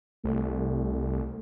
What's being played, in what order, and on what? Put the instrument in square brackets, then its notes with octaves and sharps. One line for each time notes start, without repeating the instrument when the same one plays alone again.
[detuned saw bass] C2 [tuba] A3